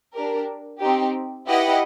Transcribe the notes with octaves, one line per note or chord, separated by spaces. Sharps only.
D4 G4 A#4
C4 D#4 G4
E4 G4 B4 D#5 F#5